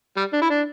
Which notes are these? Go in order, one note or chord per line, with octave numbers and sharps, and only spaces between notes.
G3
D4
E4
D4